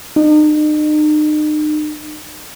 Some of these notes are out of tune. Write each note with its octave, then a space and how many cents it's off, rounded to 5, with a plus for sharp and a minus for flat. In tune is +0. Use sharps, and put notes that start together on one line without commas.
D#4 -40